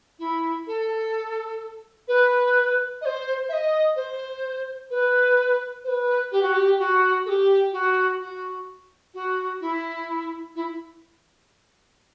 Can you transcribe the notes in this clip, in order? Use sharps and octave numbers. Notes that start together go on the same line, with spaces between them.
E4
A4
B4
D#5
C5
E5
D#5
C5
B4
C5
B4
G4
F#4
G4
F#4
A4
G4
F#4
F#4
F#4
E4
E4